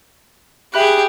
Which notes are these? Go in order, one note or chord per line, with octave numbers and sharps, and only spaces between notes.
G4 G#4 E5 B5 F#6